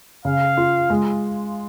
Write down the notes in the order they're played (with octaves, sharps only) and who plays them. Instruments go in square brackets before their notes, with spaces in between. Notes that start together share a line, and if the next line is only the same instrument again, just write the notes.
[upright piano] C#3 [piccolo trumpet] F5
[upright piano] F4
G#3